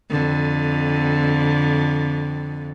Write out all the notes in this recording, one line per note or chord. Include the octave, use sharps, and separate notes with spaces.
F2 D3